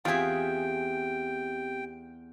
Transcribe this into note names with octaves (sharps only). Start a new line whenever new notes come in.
E2 C4 F4 G4 G#4 E5 G5 G#5